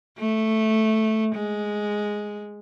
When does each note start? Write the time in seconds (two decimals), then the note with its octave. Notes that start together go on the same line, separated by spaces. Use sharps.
0.19 A3
1.35 G#3